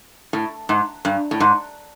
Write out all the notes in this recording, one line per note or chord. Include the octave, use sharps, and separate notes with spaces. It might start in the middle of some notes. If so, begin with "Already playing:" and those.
A2
G#2
G2
A2
G#2